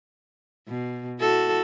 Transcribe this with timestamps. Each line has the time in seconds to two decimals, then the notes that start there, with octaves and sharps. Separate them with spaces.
0.68 B2
1.19 E4 F#4 A4